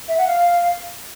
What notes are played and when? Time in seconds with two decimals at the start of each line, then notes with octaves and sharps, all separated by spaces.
0.08 E5
0.17 F#5
0.27 F5